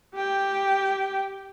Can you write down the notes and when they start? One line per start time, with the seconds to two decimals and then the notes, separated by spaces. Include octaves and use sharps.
0.15 G4 G5